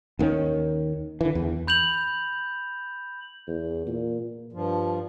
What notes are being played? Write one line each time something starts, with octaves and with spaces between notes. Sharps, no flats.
D#2 D#3 A3 C#4
D3 E3
E2
B5 G6 F7 F#7
E2
A#2
G2 F3